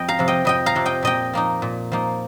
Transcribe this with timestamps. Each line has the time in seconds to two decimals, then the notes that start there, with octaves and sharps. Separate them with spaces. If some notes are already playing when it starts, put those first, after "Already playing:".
Already playing: F2 D#5 G5
0.09 F5 A#5
0.19 C3 F3
0.28 D#5 G5
0.45 F2 D#5 G5
0.66 F5 A#5
0.76 C3 F3
0.85 D#5 G5
1.03 A#2 D#5 G5
1.33 F3 A#3 D#4
1.62 A#2
1.92 F3 A#3 D#4